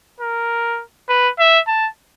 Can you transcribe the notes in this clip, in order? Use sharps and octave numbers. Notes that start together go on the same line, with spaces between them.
A#4
B4
E5
A5